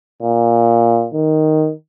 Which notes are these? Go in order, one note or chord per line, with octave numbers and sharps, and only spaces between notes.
A#2
D#3